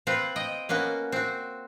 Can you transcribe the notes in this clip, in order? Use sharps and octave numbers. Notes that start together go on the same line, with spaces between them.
C4 F4 B4
D#5 G5
A#3 B3 C#4 F#4
C4 F#4